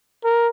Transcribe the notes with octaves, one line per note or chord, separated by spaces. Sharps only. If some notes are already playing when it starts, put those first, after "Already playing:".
A#4